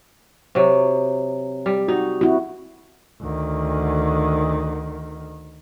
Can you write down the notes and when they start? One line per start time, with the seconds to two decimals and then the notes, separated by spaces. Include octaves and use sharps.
0.55 C3 F#3
1.66 G3
1.88 D#4 F#4
2.21 C4 E4 F#4
3.22 D2 D#3